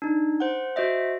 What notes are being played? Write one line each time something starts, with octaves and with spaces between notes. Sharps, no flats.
D4 D#4
C5 F#5
F#4 C5 D#5 E5